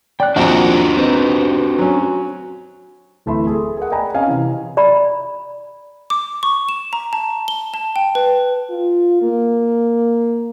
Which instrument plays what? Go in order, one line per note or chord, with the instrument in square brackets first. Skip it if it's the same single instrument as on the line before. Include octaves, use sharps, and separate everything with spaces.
[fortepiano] D5 [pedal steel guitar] G5 F#6
[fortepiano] D#2 [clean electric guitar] F3 C4 [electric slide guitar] D4 F#4 G4 [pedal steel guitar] F#5 A#5
[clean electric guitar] C4 D#4 [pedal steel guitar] B4
[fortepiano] F#3 C#4
[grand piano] D1 E3 A3 E5 B5 C6
G#4 A4
G#4 A#4 F#5
D5 D#5 G5 G#5 A#5 B5
C4 C#4 D#5 F5 G#5
C3 E3
[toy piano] D5 A#5 B5
[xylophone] D6
C#6
E7
A#5
A5
G7
A5
G5
B4
[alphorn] F4
A#3